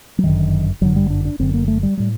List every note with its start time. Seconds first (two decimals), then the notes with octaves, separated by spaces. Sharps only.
0.18 F#3
0.24 G1 F#2 D3 D#3
0.81 G1 F#2 D3 F#3
0.96 G3
1.10 D4
1.25 D4
1.39 F#1 F#2 D3 C4
1.54 A#3
1.68 A3
1.83 G3
1.97 A2 G3